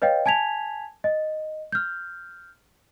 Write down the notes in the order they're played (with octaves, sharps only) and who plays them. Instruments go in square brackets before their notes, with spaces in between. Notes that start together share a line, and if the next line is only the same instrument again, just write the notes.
[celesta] B4 C#5 D#5 F5 G5
G#5 A5 G#6 B6 F7
D#5
F6 G6